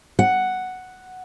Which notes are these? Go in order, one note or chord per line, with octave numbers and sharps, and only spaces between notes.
F#5